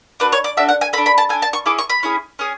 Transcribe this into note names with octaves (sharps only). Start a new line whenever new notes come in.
D4 F#4 A4 B4
C#5
D5
D4 F#4 A4 E5
F#5
G#5
D4 A4 B5
B5
A5
D4 A4 G#5
A5
C#6
C#4 E4 G#4 D6
C#6
B5
C#4 E4 G#4
C#4 G#4